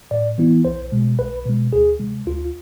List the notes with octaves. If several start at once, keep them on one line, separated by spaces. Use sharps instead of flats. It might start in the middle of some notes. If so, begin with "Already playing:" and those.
A2 D5
E3 B3 E4
B1 C5
B2 G#3
B1 B4
B2 G#3
D2 G#4
C3 G#3
D2 F4